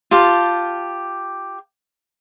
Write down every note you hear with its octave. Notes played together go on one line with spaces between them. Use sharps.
F4 G4 A5